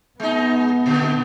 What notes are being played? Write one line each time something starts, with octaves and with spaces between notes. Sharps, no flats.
G#3 B3 D#4
A#2 D3